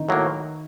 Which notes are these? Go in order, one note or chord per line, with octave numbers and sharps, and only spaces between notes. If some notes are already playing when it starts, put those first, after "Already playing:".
Already playing: D#3 D#4
A2 F#3 A#3